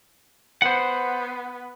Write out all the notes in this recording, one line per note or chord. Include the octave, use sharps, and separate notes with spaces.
B3 C5 F#5